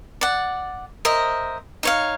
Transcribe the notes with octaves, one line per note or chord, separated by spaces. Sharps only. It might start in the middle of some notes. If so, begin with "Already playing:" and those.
D5 F#5
A#4 C5 D#5 E5
D#4 C#5 F5